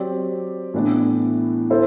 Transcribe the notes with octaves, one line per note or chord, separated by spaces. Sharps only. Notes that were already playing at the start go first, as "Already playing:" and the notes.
Already playing: F#3 C4 G4 D5
A2 E3 B3 D4
A3 E4 A4 C5